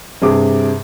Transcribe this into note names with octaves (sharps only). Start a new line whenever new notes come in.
G2 C3 G#4 D6